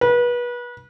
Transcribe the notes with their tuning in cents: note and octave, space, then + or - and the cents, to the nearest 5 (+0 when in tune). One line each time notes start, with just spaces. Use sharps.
B4 -30